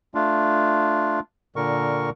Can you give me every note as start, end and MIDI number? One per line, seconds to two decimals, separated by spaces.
0.15 1.20 57
0.15 1.20 62
0.15 1.20 65
1.56 2.10 46
1.56 2.10 50
1.56 2.10 70
1.56 2.10 85